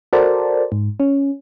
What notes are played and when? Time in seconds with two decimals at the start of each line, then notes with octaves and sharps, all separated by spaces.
0.13 F#4 A4 A#4 C5 D5 A5
0.72 G#2
1.00 C#4